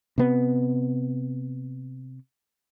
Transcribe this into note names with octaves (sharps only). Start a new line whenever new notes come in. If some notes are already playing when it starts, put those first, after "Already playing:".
C3 B3